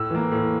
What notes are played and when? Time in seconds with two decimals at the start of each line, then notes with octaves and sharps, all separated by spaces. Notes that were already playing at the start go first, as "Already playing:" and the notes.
Already playing: A2 E6
0.10 E3 A#3
0.32 A2